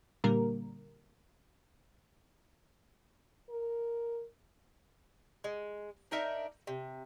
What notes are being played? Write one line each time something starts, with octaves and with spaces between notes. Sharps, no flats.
A#2 D3 G3 A#3 A#4
A#4
G#3
D4 D#4 A#4 E5
C3